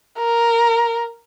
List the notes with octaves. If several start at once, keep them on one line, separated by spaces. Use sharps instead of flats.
A#4